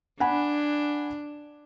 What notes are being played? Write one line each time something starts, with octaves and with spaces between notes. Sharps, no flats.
D4 F#5 G#5 B5